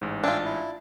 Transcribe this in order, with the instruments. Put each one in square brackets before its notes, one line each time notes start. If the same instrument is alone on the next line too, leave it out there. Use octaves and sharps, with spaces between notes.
[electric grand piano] A1 G#2
[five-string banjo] D4 F4 [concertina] E5 G5 G#5
[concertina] E4